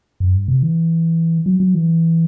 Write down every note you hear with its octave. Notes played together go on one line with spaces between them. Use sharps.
F#2
G2
C3
E3
F#3
F#3
E3